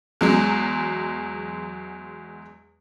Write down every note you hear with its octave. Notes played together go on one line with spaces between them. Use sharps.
E2 F#3 G#3